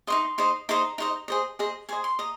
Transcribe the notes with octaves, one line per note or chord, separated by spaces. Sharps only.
D#4 C5 D#5 C6
D#4 C5 D#5
D#4 C5 D#5 A#5
D#4 C5 D#5
G#4 C5 D#5
G#4 C5 D#5
G#4 C5 D#5 G#5
C6
D#5 A#5